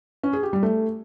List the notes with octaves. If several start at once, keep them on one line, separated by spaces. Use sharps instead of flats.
C#4
G#4
G4
G3
A3